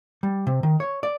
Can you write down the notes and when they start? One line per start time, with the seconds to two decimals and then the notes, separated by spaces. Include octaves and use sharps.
0.23 G3
0.47 C3
0.63 D#3
0.80 C#5
1.03 D5